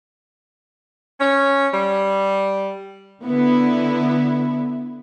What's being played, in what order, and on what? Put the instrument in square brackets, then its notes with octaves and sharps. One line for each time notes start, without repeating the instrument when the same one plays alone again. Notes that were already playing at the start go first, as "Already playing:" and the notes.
[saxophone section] C#4
G3
[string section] D3 B3 E4